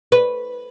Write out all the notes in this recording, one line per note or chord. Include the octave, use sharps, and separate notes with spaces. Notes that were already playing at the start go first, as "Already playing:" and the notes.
B4